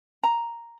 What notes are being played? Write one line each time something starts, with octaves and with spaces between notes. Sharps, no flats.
A#5